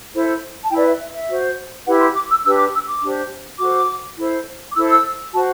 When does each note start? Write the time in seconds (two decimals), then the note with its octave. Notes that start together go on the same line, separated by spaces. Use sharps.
0.14 E4 A4 C5
0.63 A5
0.70 E4 G5
0.75 B4 D5
0.85 E5
1.00 E5
1.14 E5
1.29 F#4 C5
1.86 E4 G4 B4 F#5
2.00 C6
2.15 D6
2.30 E6
2.45 D4 G4 B4 E6
2.58 D6
2.74 E6
2.87 D6
3.02 D4 G4 C5
3.59 F#4 A4 C5 D6
4.17 E4 A4 C5
4.71 D6
4.75 E4 A4 C5 E6
4.90 E6
5.32 F#4 A5
5.37 C5